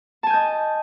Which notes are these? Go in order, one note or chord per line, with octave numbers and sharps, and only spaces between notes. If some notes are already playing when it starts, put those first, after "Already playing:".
D#5 G#5 A5 G6